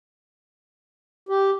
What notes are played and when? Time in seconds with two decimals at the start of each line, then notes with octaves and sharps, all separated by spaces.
1.29 G4